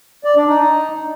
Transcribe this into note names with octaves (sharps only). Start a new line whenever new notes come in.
D5
D4
D#4